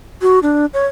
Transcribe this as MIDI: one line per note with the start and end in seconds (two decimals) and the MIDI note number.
0.22 0.39 66
0.43 0.66 62
0.74 0.87 73